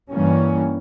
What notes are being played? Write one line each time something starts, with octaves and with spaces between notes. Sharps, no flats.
G2 E3 G3 A#3 C#4